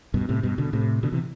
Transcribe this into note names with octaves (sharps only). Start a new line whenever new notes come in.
G2 B2
A2 C3
G2 B2
B2 D3
A2 C3
B2 D3
C3 E3